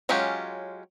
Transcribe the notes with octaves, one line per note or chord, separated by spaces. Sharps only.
F#3 G#3 C#4 F4 G4